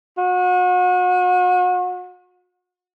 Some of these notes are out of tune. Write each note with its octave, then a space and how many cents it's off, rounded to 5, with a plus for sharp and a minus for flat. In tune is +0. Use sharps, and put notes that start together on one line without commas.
F#4 -35